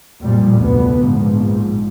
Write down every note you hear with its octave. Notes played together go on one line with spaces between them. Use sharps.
F2 A#2 G3
F1 D2 B3
A#1 G#2 F3